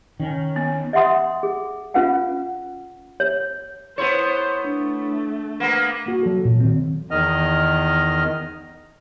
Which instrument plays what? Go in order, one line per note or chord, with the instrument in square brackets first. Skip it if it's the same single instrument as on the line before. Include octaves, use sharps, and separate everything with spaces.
[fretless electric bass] D#3 [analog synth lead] C#4
[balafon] B3
[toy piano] D#5 E5 F#5 C6 D#6
G#4
C#4 F4 B4 F5 F#5
C#5
[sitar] B3 E4 C#5 [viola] C5
[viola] A3 [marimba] D4
[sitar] A#3 B3 [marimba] F#5
[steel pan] A#3 F#4
F#3 A4
[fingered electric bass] A1 A#2
D#3 C4
[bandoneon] E2 D#3 D#5 F6